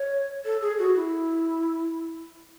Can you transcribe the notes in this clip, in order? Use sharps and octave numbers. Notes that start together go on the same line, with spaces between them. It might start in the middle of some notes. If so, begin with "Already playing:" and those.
Already playing: C#5
A4
G#4
F#4
E4